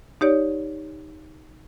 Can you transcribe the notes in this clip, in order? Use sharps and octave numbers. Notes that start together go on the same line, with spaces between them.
D#4 G4 C#5 D5